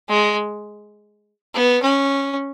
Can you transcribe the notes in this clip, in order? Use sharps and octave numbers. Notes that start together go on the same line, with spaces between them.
G#3
B3
C#4